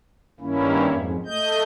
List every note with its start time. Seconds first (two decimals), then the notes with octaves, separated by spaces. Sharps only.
0.40 G2 D#3 A#3 C#4 E4
0.86 F2 G#2
1.26 A3 D#5 G6